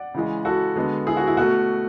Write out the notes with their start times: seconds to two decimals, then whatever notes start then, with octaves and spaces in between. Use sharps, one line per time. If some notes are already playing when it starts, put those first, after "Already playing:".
Already playing: D5 F#5
0.14 C#3 E3 G#3
0.45 F#4 A4
0.76 D3 G#3 B3
1.07 E4 G#4
1.17 F#4
1.27 E4
1.37 B2 A3 F#4